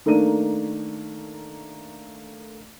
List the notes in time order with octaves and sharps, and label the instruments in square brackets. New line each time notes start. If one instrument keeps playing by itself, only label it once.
[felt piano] D#3 A3 A#3 D4 D#7